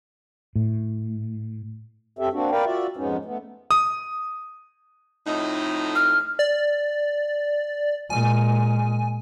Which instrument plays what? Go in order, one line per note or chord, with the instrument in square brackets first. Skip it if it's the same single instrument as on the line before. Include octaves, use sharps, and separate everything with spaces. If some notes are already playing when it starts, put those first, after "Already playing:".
[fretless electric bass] A2
[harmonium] F#2 C4 G4 A4 E5
A#3 C4 D4 F#4
A#4 B4 D5 F5 G5
F4 F#4 D5 E5
F2 G#2 G#3 B3 C#4 D#4
A3 B3
[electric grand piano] D#6
[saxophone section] F2 A2 D#4
[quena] F6
[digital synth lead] D5
[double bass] A#2 G#3 [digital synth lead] G#5